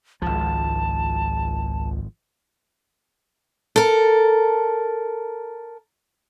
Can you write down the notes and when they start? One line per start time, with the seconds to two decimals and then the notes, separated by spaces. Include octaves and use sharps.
0.22 G#1 C#2 F3 A5
3.76 A4 A#4